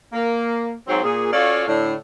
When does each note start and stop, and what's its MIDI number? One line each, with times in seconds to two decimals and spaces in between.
0.13 0.73 58
0.88 1.02 44
0.88 1.02 54
0.88 1.02 60
1.02 1.32 46
1.02 1.32 68
1.33 1.67 61
1.33 1.67 65
1.33 1.67 66
1.33 1.67 69
1.33 1.67 74
1.33 1.67 77
1.67 1.93 45
1.67 1.93 50